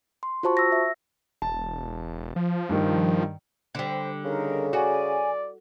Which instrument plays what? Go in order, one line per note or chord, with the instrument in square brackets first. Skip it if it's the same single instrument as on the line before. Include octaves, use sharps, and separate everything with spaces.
[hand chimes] C6
F4 F#4 C5 A5 C#6
E6 A#6
E5
[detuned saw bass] E1 [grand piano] A5
[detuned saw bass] F3
[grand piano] G2 D#3
[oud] D3 G3 [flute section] C5
[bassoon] C#3 [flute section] D#4 A#4
[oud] F#4 [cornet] D5 [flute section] G#5